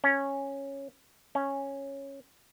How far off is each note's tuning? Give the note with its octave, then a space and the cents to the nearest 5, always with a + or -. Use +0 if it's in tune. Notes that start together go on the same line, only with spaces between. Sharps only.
C#4 -5
C#4 -5